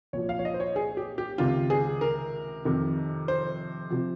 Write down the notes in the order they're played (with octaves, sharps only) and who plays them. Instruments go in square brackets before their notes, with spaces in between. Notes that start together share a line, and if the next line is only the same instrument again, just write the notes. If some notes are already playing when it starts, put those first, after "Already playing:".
[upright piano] C2 A#2 F3 C#5
F5
C#5
D#5
C5
C#5
G#4
G4
G4
C#2 C3 D#3 F4
G#4
A#4
F2 C3 D#3
C5
C3 F3